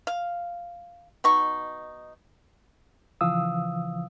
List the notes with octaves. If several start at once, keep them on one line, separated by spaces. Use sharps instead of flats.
F5
B2 D#4 C#6
C#3 E3 F3 F5 D#6 E6